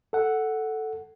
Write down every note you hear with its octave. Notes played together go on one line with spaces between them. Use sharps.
A4 F#5